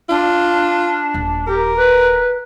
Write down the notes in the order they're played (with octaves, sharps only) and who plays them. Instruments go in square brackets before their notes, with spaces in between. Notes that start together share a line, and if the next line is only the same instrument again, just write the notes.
[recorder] D4 [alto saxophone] F4
[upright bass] D#1
[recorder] G4 [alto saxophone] A#4
[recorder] B4